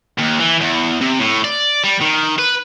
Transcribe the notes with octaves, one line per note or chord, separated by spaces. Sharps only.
D#2
E3
E2
C3
A2
D5
G3
D#3
B4